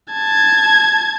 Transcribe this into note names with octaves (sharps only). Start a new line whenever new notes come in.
A5 G#6